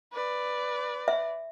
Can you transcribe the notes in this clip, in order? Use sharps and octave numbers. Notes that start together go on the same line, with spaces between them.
B4 D5
E5